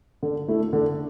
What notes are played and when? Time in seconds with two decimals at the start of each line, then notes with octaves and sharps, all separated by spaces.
0.23 D3
0.48 A3 E4
0.73 D3